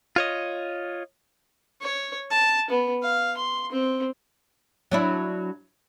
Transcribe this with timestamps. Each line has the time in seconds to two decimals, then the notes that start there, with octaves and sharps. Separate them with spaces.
0.16 F4 C#5 D#5
1.81 C#5
2.30 A5
2.70 B3
3.02 F5
3.37 C6
3.72 C4
4.91 F#3 D4 E4